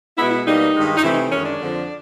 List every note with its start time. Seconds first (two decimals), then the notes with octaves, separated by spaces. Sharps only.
0.17 B2 G#3 B3 E4
0.31 E4
0.45 B2 G3 A#3 D#4
0.75 G2 D#3 G#3
0.97 D#4
1.03 C3 E3 A3 C4 E4
1.12 D#4
1.31 F#2 D#3 G#3 C#4
1.46 D4
1.60 F2 D3 F3